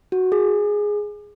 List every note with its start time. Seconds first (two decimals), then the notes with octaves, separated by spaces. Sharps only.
0.12 F#4
0.32 G#4